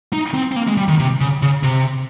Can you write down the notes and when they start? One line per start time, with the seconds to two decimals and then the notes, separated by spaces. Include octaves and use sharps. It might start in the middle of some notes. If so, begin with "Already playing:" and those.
0.13 D#4
0.34 C4
0.52 C4
0.56 A#3
0.67 G#3
0.77 G3
0.88 D#3
0.99 C3
1.21 C#3
1.42 C#3
1.63 C3